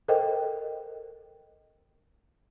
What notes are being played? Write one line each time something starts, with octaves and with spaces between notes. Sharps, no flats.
A4 A#4 C5 D#5 G5